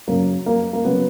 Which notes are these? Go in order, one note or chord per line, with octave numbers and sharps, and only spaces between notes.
F#2 C#3 F#3 A#3
A#3
A#3
C#3 F#3 B3